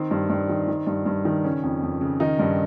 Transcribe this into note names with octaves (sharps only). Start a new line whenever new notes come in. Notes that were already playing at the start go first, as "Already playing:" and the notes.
Already playing: D#3 C4
G2
G2
D#3
D#3
G2
G2
D#3
C#3 C#4
F2
F2
C#3
D#3 D#4
G2